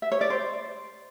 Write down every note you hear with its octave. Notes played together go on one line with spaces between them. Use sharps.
E5
C#5
D5
C5